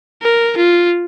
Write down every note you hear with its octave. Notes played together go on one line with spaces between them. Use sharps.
A#4
F4